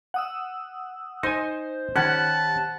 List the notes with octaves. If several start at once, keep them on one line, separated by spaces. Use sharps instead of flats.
F#5 D#6 E6
D#4 C5 G#5
D#3 C#4 G4 F#5 A5 B5